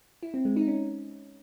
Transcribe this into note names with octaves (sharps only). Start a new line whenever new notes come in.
E4
C4
G#3
D#4
C#4